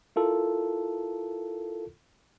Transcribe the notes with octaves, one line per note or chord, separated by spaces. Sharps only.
E4 F4 A4 A#4